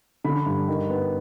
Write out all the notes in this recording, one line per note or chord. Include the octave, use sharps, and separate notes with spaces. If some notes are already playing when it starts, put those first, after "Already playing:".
D3 B5
G2
D#3
B3